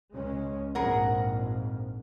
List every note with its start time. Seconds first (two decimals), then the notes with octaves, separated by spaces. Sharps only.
0.12 C#2 G#3 C#4
0.75 A#1 F2 G#2 G#4 A#4 F#5